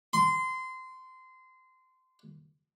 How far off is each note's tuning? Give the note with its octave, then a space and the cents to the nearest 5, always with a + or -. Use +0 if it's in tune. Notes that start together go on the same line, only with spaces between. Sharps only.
C6 -20